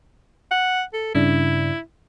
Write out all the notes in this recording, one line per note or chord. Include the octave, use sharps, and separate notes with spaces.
F#5
A4
G2 C#3 D4 E4